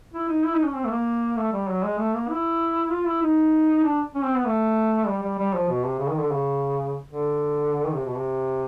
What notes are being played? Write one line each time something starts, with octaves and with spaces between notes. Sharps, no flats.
E4
D#4
E4
D#4
C#4
C4
A3
A#3
A3
G3
F#3
G#3
A3
A#3
E4
F4
E4
D#4
D4
C#4
C4
B3
A3
G3
G3
G3
F3
B2
C3
C#3
D#3
D3
C#3
D3
D#3
C3
B2
C3